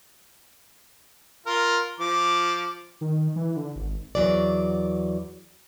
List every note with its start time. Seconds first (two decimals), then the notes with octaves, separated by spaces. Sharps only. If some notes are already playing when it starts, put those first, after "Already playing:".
1.46 F4 A#4
2.00 F3 D6
3.01 D#3
3.36 E3
3.56 D3
3.76 G#1
4.15 E2 F#3 D5